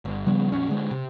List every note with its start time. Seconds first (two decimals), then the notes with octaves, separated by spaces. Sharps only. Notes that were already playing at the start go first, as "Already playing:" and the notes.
0.05 G1
0.27 C#3 F3 G3 B3
0.52 A#1 F2 C#4
0.69 D3 G#3 C4
0.91 C3